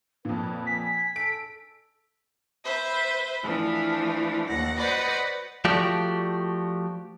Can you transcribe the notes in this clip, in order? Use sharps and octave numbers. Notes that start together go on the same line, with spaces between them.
F2 A#2 B4
G#5 B6
A4 D7
B4 C5 E5
E3 F3 A3 D4
D#2 F#5 A#6
F#4 B4 C5 D5 D#5 F#5
F3 A3 F#4 G4 D5